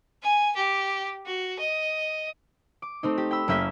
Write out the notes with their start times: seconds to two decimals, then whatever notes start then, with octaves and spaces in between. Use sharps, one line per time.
0.23 G#5
0.55 G4
1.26 F#4
1.59 D#5
2.82 D6
3.03 A3 C4 D#4
3.18 G4
3.31 G5 B5 E6
3.48 F#1 A#3 C#4 E5 G6 B6